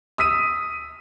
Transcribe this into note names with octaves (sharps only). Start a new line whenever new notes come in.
D#6 E6 B6 D#7